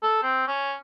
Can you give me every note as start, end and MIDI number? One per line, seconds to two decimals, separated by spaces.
0.03 0.21 69
0.23 0.46 60
0.47 0.75 61